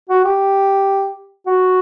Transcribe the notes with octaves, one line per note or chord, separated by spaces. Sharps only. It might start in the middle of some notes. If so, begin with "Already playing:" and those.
F#4
G4
F#4